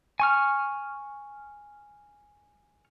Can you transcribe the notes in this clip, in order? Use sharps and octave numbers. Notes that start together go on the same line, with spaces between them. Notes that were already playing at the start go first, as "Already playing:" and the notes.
G#5 C#6 F6